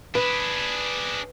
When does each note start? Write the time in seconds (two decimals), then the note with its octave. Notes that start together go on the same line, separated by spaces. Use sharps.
0.15 D4 G#4 B4